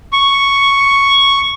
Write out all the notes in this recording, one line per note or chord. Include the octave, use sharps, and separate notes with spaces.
C#6